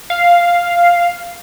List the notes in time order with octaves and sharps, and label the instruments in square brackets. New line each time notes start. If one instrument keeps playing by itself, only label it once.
[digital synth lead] F5